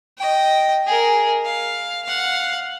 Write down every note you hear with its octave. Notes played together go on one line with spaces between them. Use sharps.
D#5 G5
G#4 A#4
F5
F5 F#5